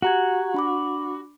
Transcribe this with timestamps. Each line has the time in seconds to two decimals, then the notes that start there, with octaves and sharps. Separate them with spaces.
0.02 F#4 G4 A#5 G#6
0.54 D4 B5 D6